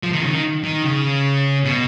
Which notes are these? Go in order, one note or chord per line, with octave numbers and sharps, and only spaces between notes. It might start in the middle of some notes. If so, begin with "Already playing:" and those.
F3
D#3
C#3
D#3
D#3
C#3
B2